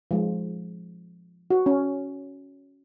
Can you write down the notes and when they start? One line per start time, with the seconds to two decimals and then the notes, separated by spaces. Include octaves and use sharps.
0.11 F3 G#3
1.50 F#4
1.66 C#4